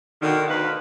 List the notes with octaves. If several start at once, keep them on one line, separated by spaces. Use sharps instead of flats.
B2 D3 D#3
D2 D#4 B4 F5